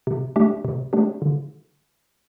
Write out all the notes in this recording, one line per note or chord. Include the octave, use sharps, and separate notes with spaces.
C3
A3 D4 G4
C3
A3 D4 G4
D3